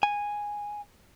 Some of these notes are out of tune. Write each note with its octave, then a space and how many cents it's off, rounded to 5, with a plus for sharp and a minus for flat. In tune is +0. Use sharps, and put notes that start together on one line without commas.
G#5 -10